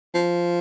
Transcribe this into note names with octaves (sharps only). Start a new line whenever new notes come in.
F3